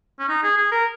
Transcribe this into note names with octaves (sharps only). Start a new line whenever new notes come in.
C#4
D#4
G#4
G#4
A#4